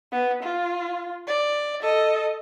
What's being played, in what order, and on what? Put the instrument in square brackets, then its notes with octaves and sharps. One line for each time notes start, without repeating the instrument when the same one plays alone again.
[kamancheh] B3
F4
D5
A4 D#5